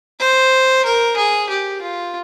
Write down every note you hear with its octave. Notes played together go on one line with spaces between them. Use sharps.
C5
A#4
G#4
G4
F4